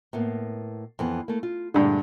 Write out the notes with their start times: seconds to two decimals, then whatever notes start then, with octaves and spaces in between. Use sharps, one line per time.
0.13 A2 A#3 B3
0.99 F2 E3 B3
1.28 A3 A#3
1.43 F4
1.74 G2 A#2 D3 G#3 A3